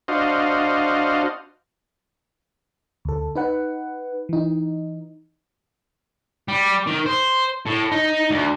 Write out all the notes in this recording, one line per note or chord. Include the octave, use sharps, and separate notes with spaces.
D4 F#4 C5 D#5 F5
D2 A4
D#4 B4 F#5
E3 D#4
G3
D#3
C5
A2
D#4
D2